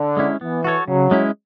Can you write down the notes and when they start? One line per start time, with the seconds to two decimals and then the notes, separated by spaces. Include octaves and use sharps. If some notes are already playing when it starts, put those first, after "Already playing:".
Already playing: D3
0.17 G#3 C#4 E4
0.41 E3 B3
0.64 F#4 A4 C#5
0.87 C#3 F#3
1.11 G#3 C#4 E4